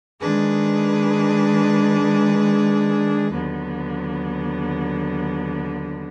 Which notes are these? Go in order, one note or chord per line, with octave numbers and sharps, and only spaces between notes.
D#3 G#3 D4 G#4 B4
D#2 D3 F#3 B3